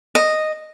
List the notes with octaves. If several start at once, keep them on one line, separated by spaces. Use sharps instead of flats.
D#5